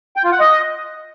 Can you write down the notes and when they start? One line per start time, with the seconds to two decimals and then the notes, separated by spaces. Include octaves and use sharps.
0.16 G5
0.24 F4
0.32 F#5
0.40 D#5